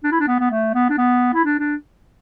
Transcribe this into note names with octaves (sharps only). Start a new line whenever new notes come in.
D4
E4
D4
B3
B3
A3
B3
D4
B3
E4
D4
D4